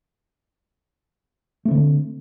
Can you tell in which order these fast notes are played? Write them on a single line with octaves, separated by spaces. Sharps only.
A3 C4 D3